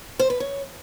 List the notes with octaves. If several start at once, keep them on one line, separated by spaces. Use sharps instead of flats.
C5
B4
C#5